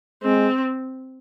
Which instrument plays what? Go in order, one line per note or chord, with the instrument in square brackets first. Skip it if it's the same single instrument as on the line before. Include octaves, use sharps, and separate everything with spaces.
[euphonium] G#3 [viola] C4